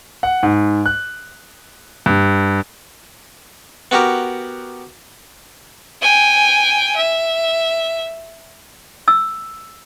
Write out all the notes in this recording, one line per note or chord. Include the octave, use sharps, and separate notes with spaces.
F#5
G#2
F#6
G2
B3 F#4 G4 A#4
G5 G#5
E5
E6